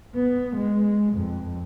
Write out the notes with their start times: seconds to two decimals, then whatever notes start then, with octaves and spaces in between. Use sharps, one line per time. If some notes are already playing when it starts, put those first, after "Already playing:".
0.15 B3
0.56 G#3
1.13 F2